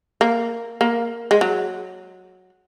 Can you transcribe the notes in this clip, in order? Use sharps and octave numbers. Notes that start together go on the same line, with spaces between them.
A#3
A#3
G#3
F#3